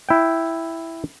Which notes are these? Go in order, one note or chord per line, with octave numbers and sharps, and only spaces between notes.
E4 G5